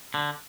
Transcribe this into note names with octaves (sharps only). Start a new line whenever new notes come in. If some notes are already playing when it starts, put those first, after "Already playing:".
D3